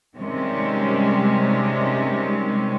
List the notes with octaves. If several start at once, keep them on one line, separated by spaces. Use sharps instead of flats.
C3 D#3 G3 G#3 C#4